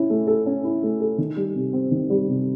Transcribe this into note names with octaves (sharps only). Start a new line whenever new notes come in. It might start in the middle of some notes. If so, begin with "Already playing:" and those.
Already playing: C#4 E4
A3
A4
C#4
E4
A3
A4
D#3
G3
C3
C4
D#3
G3
C3